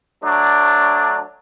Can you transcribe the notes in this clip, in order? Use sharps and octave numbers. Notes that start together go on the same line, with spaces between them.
F#3 A3 D4